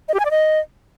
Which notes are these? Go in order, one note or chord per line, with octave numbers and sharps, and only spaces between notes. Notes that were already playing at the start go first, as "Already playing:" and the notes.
D#5
G4
G#5
D5
D#5